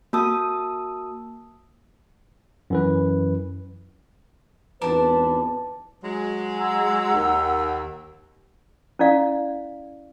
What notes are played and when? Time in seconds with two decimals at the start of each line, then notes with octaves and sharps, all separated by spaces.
0.13 A#3 F#4 A5 D#6 E6
2.70 F#2 E3 B4
4.82 G#1 E2 D4 B4 A5
6.04 F#3 G#3
6.59 F#5 A#5 E6
7.14 D#2
8.99 C#4 E4 D5 F5